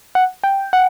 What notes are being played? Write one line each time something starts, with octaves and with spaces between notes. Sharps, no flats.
F#5
G5
F#5